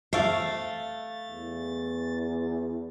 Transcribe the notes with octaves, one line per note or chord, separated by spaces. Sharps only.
C3 A3 F5 A6
E2